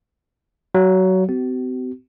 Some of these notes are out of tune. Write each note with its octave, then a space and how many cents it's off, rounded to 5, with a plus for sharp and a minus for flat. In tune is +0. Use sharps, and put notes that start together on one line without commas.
F#3 +20 F5 +0
C4 -45 F#4 +45